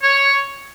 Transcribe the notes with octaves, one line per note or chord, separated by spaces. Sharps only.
C#5